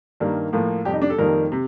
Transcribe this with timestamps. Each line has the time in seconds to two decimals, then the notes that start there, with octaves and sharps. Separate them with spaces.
0.20 G2 D#3 G3 A#3
0.53 A2 F3 A#3
0.85 F2 C3 G3 G4
0.93 D#4
1.02 D4
1.10 A4
1.18 F2 D#3 G3 A#3 A#4
1.52 C3